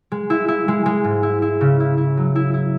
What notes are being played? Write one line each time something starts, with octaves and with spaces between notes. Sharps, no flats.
G#3
E4
E4
G#3
G#3
G#2
E4
E4
C#3
E4
E4
F#3
E4
E4